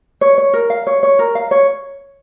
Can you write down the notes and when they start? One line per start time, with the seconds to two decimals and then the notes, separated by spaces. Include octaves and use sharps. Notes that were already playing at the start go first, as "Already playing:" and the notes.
0.21 C#5
0.38 C#5
0.53 A#4
0.70 F5
0.87 C#5
1.03 C#5
1.19 A#4
1.35 F5
1.51 C#5